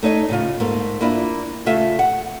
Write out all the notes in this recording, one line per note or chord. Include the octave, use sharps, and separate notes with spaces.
A3 D#4 C#5 D#5
A2 C#3 F4
G#2 A3 A#3
A#3 D4 E4 F4
C#3 A3 F4 E5
F#5